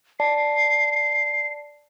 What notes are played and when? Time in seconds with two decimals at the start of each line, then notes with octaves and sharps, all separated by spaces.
0.20 D5 A5 C7